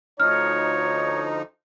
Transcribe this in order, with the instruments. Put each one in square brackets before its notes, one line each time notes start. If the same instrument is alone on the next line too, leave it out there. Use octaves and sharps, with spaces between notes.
[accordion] D2 F3 D#4 [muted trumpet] C#5 [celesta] F6